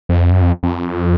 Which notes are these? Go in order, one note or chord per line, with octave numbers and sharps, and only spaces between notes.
F2
F#2
F2
F2